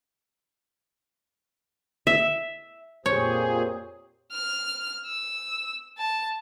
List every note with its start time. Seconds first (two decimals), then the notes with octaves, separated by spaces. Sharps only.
2.07 E5
3.06 F2 A#2 G4 G#4 C5 C#5
4.32 F6
5.07 E6
5.98 A5